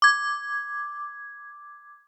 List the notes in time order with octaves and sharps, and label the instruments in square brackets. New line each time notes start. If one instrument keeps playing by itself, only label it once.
[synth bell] D6 G#6